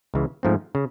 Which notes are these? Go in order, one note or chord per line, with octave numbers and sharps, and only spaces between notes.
C#2 C#3 E3
G#2 F3 A3 C4
C#3